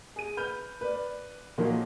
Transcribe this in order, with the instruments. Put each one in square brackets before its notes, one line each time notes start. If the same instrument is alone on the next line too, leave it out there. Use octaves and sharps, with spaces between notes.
[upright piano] G#4 D#7
B4 B5 F6 G6
B4 D5
A#2 D#3 F3 F#3 A#3